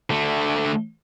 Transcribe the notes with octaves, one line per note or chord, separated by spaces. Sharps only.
D3 A3